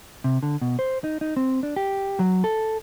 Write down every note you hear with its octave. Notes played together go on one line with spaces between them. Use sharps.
C3
D3
B2
C5
D#4
D#4
C4
D4
G4
F#3
A4